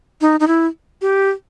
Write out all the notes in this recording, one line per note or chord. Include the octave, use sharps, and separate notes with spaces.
D#4
D#4
E4
G4